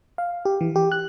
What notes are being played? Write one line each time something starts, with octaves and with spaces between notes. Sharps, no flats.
F5
G4
E3
G4
F#6